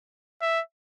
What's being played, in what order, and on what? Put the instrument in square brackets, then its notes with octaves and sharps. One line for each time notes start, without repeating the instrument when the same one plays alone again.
[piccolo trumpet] E5